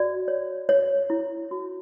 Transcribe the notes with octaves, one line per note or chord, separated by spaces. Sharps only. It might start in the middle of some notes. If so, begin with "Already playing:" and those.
Already playing: F#4 D5
C#5
C#5
E4
F#4